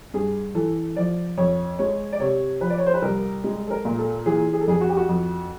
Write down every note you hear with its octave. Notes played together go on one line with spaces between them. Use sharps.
G2 G#4
E3 A4
F3 D5
F2 C#5
G#3 C#5
D5
C3 C#5
F3 B4
D5
C#5
C5
B4
C2 A#4
G#3
A4
A#4
A#2
A4
E3 G#4
G#4
A4
F2 G#4
F#4
G4
F#4
F2